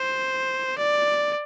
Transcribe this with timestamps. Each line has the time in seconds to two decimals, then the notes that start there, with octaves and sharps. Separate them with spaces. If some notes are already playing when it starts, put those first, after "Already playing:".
Already playing: C5
0.79 D5